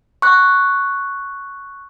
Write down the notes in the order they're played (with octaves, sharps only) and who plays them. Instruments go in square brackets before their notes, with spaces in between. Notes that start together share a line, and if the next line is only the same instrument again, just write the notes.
[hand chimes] C#6 F#6